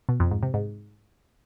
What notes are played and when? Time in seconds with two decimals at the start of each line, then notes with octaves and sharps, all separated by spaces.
0.09 B2
0.20 F2
0.31 G#2
0.43 C3
0.54 G#2